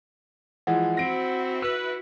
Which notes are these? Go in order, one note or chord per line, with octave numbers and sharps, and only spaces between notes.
E3 F3 G#3 F#5
C4 E4 F#4 A#6 D7
B4 E6